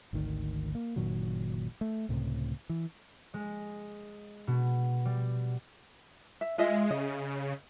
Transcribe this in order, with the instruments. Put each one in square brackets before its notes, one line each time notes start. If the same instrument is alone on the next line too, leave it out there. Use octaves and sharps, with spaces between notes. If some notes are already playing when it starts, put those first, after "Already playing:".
[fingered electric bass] G#1 D2 D#3
A#3
F#1 A#2 D#3 F#3
A3
C#2 A2 C3
E3
[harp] G#3
B2
G3
[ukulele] E5
[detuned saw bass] G#3 [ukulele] F4 D#5 E5
[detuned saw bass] C#3 [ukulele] D#5